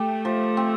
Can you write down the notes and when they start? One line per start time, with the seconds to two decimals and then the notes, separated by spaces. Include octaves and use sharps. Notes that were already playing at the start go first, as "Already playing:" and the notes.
Already playing: A3 G4
0.25 F3
0.57 C4